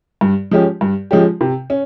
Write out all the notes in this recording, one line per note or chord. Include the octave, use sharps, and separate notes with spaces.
G2
F3 G#3 C#4 G4
G2
F3 G#3 C#4 G4
C3
C#4